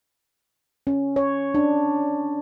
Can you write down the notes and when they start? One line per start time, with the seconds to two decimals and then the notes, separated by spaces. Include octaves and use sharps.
0.87 C#4
1.16 C#5
1.55 D4